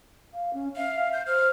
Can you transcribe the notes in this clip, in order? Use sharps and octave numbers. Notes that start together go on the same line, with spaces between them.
F5
C#4
E5 F5
G6
C5 F6